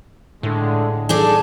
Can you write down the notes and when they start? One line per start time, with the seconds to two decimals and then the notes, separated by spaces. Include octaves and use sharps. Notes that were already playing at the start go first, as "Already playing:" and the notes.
0.43 A2 D3 G#3
1.09 D4 D#4 G#4 A4 D5